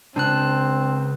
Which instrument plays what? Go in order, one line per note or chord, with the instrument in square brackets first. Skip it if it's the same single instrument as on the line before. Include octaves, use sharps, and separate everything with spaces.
[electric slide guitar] C#3 G#3 [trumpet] C4 [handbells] D4 A5 F#6